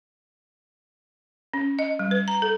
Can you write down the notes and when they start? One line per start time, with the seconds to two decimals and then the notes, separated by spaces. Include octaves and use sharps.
1.53 C#4
1.79 D#5
1.99 G3
2.11 B4
2.28 A#5
2.42 A4